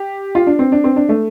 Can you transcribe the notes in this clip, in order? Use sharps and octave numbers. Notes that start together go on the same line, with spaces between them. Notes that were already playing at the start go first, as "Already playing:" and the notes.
Already playing: G4
F4
D4
C4
D4
C4
D4
A3